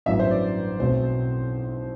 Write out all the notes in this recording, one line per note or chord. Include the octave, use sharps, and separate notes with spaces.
A1 G2 F#3 B3 E5
C5
D5
B1 B2 A3 C4 C5